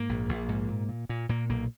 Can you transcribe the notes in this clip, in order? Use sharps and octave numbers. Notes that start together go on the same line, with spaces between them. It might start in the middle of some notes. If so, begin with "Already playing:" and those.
Already playing: G#2 A#3
A#1
A#1
G#2
A#2
A#2
A#2
A#2 A#3
B1 A#3